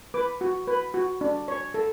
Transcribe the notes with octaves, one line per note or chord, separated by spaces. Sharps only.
B4 D6
F#4
B4
F#4
D4
C#5
A4